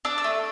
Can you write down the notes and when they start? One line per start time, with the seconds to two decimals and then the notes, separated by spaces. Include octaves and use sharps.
0.05 D4 E6
0.18 E6
0.24 A3